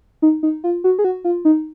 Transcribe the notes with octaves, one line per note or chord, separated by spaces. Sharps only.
D#4
D#4
F4
F#4
G#4
F#4
F4
D#4